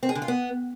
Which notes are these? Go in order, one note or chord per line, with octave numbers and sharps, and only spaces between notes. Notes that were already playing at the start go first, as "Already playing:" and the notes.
C4
G#4
D3
F4
B3